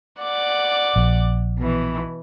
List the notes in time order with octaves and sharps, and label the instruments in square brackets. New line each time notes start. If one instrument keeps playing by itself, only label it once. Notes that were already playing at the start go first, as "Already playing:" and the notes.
[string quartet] D5 F#5 D6
[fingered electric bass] A#1
[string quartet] B2 E3